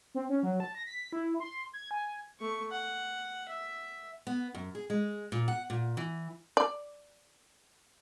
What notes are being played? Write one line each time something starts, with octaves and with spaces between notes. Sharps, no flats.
C4
C#4
F#3
A5
A#6
B6
E4
C6
G#6
G#5
A3 C#6
F#5
E5
B3
F#2
G#4
G#3
A#2
F#5
A#2
E3
D5